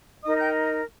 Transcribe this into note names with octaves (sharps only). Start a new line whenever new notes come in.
D#4 A#4 D#5 D#6
G5 G6